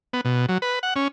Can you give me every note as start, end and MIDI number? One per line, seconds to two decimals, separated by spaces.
0.13 0.21 59
0.25 0.46 47
0.49 0.58 54
0.62 0.79 71
0.83 0.94 78
0.96 1.08 61